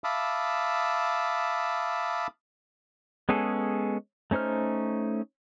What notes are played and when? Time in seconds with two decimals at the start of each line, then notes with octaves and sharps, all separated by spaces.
0.04 E5 F5 A5 B5 D6 D#6
3.29 G#3 B3 C#4 G#4 A4
4.31 A3 C#4 D#4 C5 F6